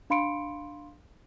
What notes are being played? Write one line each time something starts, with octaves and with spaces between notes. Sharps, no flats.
D4 F5 B5 C6 C#7 D7